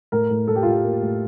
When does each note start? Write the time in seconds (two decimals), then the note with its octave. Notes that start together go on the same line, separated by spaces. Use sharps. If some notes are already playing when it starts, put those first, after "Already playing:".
0.12 A2 A#4
0.30 A2
0.47 A2 A4
0.56 G4
0.63 F4
0.66 A2 G4
0.85 A#3
1.02 A2